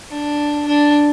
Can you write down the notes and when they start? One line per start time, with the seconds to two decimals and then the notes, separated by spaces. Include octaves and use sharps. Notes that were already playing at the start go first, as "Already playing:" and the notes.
0.10 D4
0.67 D4